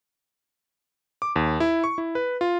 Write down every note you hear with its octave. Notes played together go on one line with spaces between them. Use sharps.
D6
D#2
E4
C#6
E4
B4
F4